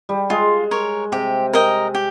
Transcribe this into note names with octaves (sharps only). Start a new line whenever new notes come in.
G3
G#3 F4
A#4 C#5
C3 G4
A#4 D#5 G5
G4